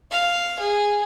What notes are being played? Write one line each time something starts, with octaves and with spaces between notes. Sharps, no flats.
F5
G#4